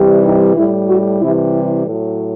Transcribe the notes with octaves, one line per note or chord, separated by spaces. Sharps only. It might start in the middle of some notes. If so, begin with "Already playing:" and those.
Already playing: C3 E3 G3
D#4
A2 G3 E4
F#4
C3 E3 G3 E4
E4
A2 F#3